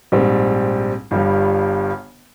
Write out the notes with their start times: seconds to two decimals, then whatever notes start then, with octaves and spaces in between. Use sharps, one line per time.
0.12 A#1 G#2 G3 C4
1.11 G1 G2 G3